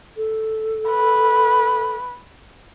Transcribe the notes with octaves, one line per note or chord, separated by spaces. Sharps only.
A4
B4